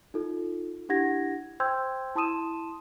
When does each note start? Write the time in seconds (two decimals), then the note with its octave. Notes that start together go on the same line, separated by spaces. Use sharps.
0.14 D#4 F4 A4
0.89 D4 E4 G4 F#5 G#6 A#6
1.60 C5 G5 C6 E6 G6 G#6
2.15 E4 A5 C6 D#6 D#7 E7